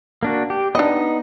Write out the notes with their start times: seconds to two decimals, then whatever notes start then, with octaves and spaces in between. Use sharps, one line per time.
0.23 A#3 D4 F#4
0.50 G4
0.75 B3 D4 D#4 D#5